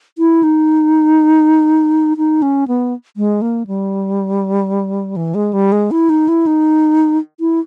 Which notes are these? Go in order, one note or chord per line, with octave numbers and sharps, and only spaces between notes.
E4
D#4
D#4
C#4
B3
G#3
A#3
G3
E3
G#3
G3
G#3
E4
D#4
E4
D#4
E4